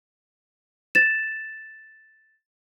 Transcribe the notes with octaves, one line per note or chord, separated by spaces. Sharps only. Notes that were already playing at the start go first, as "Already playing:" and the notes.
A6 E7